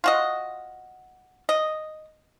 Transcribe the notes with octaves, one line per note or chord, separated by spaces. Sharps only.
F4 F#4 D#5
D#5